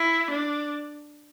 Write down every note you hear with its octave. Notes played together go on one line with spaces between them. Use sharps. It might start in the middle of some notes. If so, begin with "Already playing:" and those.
Already playing: E4
D4